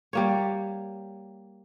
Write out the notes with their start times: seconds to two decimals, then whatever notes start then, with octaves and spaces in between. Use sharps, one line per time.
0.13 G3 A#3 C#5